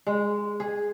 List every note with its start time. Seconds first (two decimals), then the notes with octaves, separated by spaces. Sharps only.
0.07 G#3
0.60 G#4